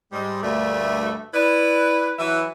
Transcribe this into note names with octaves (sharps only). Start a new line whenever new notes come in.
G#2 G3 G#3
D2 G2 A3 A#3 D5 E5
E4 B4 D5
E3 F#3 E4 B4 E5